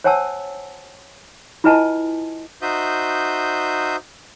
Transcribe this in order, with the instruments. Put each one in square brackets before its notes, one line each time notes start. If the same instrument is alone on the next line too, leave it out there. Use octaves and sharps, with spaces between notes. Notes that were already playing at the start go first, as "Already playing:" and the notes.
[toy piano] C5 C#5 F#5 G#5 A5 E6
E4 F4 B4 D#5 G#5 A5
[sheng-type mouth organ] D#4 F#4 C5 E5 D#6 G6